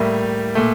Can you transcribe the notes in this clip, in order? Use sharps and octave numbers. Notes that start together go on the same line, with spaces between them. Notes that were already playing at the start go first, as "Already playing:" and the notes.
Already playing: A2 G3 A#3 E5
A#2 A3